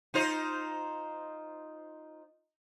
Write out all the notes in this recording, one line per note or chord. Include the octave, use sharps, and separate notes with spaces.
D#4 F4 C5